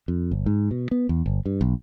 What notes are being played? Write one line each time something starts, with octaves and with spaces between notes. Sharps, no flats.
F2
G1
G#2
B2
B3
E2
G1
G2
B1